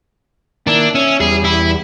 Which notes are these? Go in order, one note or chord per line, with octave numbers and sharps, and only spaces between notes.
D#3 A#3 D4 E4
C#4 E5
E2 G3 G#4
E4